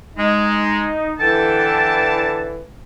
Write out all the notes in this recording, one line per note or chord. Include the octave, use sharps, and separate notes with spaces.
G#3 D#4
D3 E3 A4 G5 A5